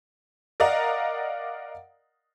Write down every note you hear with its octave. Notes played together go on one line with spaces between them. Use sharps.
A#4 D5 D#5 F5 F#5 A#5